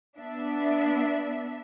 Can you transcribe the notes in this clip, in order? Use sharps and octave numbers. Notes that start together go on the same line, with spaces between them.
B3 D4 E5